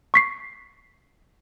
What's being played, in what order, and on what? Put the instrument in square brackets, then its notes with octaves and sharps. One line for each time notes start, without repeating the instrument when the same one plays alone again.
[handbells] C#6 B6 C7